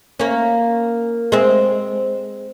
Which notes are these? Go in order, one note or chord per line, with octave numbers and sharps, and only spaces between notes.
A#3 C#4
G#3 C4